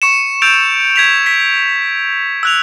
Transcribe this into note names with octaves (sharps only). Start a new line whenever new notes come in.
C#6 C#7 E7
E6 G6 A6 D7 F7
G#6 B6 F7
B6
E6 F#6 F7